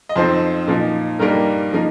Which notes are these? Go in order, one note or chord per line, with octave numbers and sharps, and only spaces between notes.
D#5
F2 F3 C4 D#4 C5
A#2 F3 D#4
G2 G3 A#3 D#4 A#4
F3 A#3 D#4